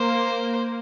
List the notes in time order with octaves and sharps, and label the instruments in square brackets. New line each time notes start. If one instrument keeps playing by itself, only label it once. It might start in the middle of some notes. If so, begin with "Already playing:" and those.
Already playing: [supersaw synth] A#3 [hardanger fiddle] C5